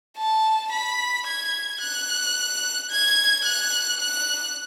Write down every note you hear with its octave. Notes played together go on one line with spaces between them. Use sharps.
A5
B5
G#6
F#6
G#6
F#6
F#6